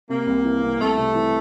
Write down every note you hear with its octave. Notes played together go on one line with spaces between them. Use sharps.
C3 A#3
C2
E3
C2
C2 A3
C3
E3